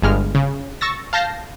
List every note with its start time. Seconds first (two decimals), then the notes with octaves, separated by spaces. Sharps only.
0.02 G1 G2 G#3 F6
0.35 C#3
0.81 C#6 E6 A6 A#6
1.13 F5 A5 G6 A#6 C7